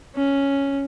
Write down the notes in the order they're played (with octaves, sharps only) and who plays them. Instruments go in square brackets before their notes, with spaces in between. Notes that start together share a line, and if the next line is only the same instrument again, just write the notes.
[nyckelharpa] C#4